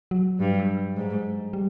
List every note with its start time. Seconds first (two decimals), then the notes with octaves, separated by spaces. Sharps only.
0.11 F#3
0.39 G2
0.97 G#2
1.53 G3